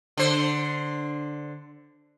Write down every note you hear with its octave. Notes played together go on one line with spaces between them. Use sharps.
D3 C5